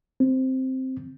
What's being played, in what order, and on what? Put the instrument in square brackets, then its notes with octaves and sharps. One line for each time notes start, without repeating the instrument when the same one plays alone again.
[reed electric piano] C4